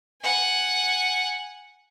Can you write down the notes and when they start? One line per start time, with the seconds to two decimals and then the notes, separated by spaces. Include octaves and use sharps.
0.22 F#5 G#5